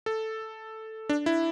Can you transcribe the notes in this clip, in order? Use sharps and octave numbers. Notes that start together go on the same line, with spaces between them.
A4
D4
E4